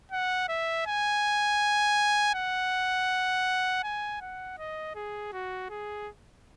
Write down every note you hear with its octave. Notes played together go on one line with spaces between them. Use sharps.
F#5
E5
G#5
F#5
G#5
F#5
D#5
G#4
F#4
G#4